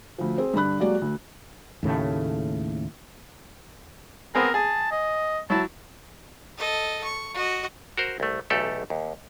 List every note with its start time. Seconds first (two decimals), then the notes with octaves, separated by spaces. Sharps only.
0.18 D2 F3
0.38 C4 G#4
0.53 G2 D3 D4 B5 F#6
0.80 F#3 G#3 A#3 F#4 G4 D5
1.02 D2
1.83 D#2 A2 C#3 A3
4.35 B3 C4 G#4 A#4
4.54 G#4 A5
4.91 D#5
5.50 F#3 E4 A5
6.58 A4 D#5
7.04 C#6
7.34 F#4 D#5
7.98 F#4 A#4 C5
8.20 C2 A3
8.50 B1 E2 A3 G4 A4
8.90 D#2